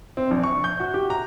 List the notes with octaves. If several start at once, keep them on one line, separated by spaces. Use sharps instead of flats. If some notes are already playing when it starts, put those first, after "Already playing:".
C4
A#1
C#6
G6
F#4
G4
A#5